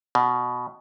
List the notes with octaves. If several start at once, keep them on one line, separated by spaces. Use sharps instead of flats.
B2